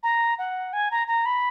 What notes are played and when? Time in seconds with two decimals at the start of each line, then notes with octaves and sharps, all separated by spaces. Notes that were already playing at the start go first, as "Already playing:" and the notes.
0.03 A#5
0.38 F#5
0.73 G#5
0.91 A#5
1.07 A#5
1.26 B5